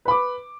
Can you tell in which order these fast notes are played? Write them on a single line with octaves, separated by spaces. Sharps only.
B4 B5 D6